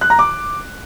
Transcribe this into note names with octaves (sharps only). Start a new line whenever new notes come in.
F#6
A#5
D6